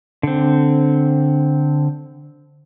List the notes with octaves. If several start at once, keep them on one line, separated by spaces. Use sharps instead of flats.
D3 C4